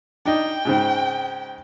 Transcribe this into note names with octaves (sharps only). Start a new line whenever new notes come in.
D4 D#4 G5
G#2 C#3 C4